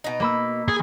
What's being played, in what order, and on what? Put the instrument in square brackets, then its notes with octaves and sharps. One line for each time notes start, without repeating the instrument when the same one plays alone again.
[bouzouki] B2 D#4
[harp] A#3 B5 E6
[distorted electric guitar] G#4